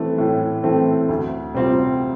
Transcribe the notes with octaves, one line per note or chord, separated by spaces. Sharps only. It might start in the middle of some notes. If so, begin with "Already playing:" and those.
Already playing: E3 A3 C4
A2
E3 A3 C4
D2
C3 G3 C4 F4